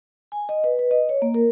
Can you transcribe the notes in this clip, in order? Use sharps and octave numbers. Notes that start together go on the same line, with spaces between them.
G#5
D#5
B4
B4
D#5
C#5
A#3
A#4